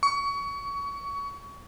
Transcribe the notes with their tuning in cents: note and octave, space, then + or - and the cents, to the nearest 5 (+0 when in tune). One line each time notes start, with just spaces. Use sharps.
C#6 +25